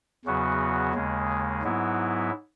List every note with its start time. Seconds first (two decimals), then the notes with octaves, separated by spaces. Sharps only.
0.25 E2 C#3 F#3 B3 F#4
0.94 D#2 C#3 G#3
1.63 G#2 F#3 B3 E4